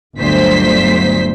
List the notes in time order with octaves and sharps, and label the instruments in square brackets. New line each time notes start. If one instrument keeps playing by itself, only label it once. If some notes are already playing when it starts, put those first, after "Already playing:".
[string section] G1 D2 F#3 C5 B6